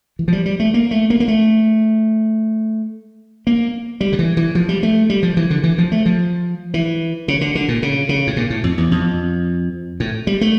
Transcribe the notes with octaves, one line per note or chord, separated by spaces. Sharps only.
E3
F3
G3
G3
A3
A#3
A3
A#3
A#3
A3
A#3
G3
D3
E3
E3
F3
G3
A3
G3
F3
E3
D3
E3
F3
A3
F3
E3
C#3
D3
D3
A#2
C#3
C#3
A2
A#2
A2
F2
E2
F2
A2
G3
A3